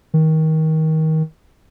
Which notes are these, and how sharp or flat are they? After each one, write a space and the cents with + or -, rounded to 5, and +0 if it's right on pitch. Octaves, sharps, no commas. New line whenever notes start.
D#3 +25